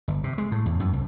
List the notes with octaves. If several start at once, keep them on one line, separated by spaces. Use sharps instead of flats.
G1
C3
G#3
A2
E2
F#2
C2